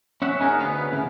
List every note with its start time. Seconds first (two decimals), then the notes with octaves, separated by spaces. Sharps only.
0.22 C#4 E5 F#5
0.40 C#4 D#4 G#4 A#4
0.59 D2 B3 B4 F5
0.93 C#3 E3